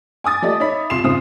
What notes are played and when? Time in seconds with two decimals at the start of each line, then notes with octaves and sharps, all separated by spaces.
0.24 G#5 D6 D#6 A6
0.42 F3 A3 G4 D5 D#5
0.60 D#4 C#5 E5 B5 B6
0.90 C2 F4 C6 C7 E7 F7
1.04 F1 G#2 C#3 F4 C5 D#6